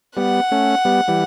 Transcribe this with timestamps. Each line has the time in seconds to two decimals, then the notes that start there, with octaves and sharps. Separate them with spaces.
0.17 G3 B3 F#5
0.51 A3 C#4
0.85 G3 B3
1.08 E3 G3